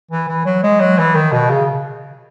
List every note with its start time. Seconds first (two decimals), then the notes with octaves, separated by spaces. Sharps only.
0.11 E3
0.28 E3
0.46 F#3
0.63 G#3
0.80 F#3
0.98 E3
1.15 D#3
1.32 B2
1.50 C#3